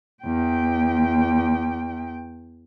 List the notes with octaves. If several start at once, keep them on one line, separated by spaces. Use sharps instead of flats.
E2 G5